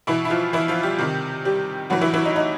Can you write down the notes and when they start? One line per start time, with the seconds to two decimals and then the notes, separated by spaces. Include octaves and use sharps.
0.07 B2 E3 E4
0.25 E4
0.30 F3 F4
0.53 E3 E4
0.68 F3 F4
0.83 G3 G4
0.98 C3 D#3
1.45 G3 G4
1.90 A2 E3 F#3 F#4
2.01 E3 E4
2.13 E3 E4
2.25 D#4
2.36 D#4